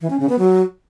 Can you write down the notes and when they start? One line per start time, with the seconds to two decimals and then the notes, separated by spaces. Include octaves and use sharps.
0.01 E3
0.10 C#4
0.20 C#3
0.29 B3
0.39 F#3